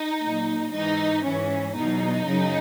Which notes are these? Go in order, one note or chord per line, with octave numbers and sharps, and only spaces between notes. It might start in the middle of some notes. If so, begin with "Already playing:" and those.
Already playing: D#4
A#2 F#3
G#2 E3 D#4
G#2 E3 C#4
E2 B2 F#3 D#4
F#2 C#3 F#3